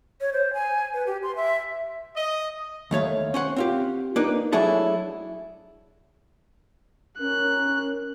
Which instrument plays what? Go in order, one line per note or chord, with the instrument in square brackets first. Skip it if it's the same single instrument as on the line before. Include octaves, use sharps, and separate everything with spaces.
[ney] C#5
C5
G#5
B4
G4
C6
E5
[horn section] D#5
[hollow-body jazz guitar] D#2 A3 C#5 F5
C#4 C5 F#5
C4 F4 G4
A#3 D4 D#4 B4
F#3 A3 D4 E4 G#4 A4
[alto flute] C#4 [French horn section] A#4 [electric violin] F#6